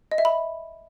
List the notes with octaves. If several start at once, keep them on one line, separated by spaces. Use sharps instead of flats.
D#5
E5
B5